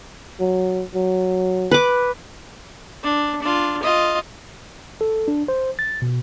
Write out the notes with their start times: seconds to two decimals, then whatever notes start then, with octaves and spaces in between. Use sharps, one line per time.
0.40 F#3
0.94 F#3
1.71 B4 D6
3.03 D4
3.42 D4 F4
3.83 F4 D#5
5.01 A4
5.28 D4
5.48 C5
5.79 A6
6.02 B2